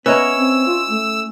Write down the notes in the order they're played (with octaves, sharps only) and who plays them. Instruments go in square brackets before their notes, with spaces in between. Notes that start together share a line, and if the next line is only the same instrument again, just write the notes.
[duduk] B3 [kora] C#4 E4 C#5 [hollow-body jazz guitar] B4 D#5 A#5 [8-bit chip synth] E6
[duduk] C4
F4
A3